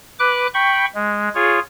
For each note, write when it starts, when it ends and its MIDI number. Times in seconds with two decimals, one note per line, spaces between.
0.19 0.47 71
0.19 0.47 86
0.19 0.47 90
0.54 0.85 79
0.54 0.85 83
0.54 0.85 85
0.95 1.29 56
1.35 1.59 65
1.35 1.59 68
1.35 1.59 73